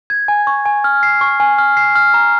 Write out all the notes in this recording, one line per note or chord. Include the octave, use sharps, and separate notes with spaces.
G#6
G#5
C#6
G#5
F6
C7
C#6
G#5
F6
C7
F6
A#5